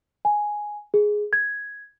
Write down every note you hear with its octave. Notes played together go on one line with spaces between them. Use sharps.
G#5
G#4
G#6